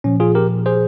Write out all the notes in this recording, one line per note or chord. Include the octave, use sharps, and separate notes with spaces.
A#2 F3 C#4
F4 G#4
G4 A#4
G#4 C5